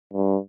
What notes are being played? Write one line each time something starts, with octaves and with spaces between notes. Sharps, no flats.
G2